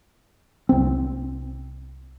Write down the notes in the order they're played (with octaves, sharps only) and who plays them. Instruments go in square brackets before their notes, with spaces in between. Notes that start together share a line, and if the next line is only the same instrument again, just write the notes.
[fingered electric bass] C2 C4